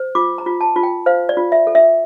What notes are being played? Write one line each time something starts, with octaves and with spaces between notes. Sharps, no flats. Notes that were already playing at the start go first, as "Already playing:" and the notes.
Already playing: C5
F4 D6
A#5
F4
A5
F4
G5
C5 F5
D5
F4
E5
A4
E5